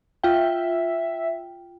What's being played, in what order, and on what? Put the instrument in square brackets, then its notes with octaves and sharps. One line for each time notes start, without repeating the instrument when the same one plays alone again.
[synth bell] F4 G5 [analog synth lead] E5